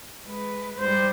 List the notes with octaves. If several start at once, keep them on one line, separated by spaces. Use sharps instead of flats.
G#3 B4
G#2 G3 C5